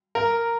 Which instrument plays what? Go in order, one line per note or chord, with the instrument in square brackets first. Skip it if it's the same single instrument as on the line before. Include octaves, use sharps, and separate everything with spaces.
[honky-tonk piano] A#4